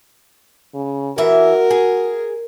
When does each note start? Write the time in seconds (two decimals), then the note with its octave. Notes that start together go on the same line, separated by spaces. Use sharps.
0.74 C#3
1.18 E3 F#4 A#4 E5
1.70 G#4